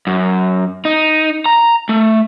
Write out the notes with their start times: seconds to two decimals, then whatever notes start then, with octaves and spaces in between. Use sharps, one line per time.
0.07 F#2
0.85 D#4
1.46 A#5
1.89 A3